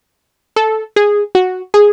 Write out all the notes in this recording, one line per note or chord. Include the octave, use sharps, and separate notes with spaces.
A4
G#4
F#4
G#4